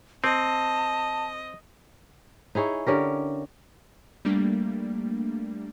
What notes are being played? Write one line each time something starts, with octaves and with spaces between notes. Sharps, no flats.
C4 D#5 A5
D#4 E4 G#4 C#5
D3 C#4 G4 A#4
G3 A3 A#3 D4